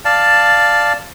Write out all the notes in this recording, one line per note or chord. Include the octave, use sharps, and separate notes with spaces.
D5 F5 A5